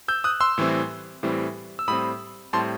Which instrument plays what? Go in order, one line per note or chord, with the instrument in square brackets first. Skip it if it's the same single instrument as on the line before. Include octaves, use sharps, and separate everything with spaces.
[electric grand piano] E6 G6
D#6 F#6
C6 E6
A2 E3 G3 C4
A2 E3 G3 C4
E6
A2 G3 C4 B5 D#6
A2 G3 C4 A5 C6